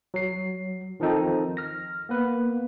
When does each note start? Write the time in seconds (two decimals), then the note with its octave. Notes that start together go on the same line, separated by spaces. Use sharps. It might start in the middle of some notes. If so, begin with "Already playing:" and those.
0.14 F#3 C7
1.00 D#3 F3 C4 D#4 A4
1.57 F6 A#6
2.09 A#3 B3 B4